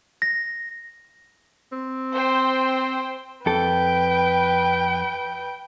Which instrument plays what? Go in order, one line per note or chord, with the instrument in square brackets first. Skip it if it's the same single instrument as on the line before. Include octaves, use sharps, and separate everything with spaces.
[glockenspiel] A#6
[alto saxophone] C4
[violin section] C5 G5 C6
[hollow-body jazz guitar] F2 A4 [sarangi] B4 [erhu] G5